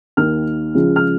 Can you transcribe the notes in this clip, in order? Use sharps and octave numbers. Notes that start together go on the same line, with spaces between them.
D#2 D#3 F6
C#2 C#3 F3
F6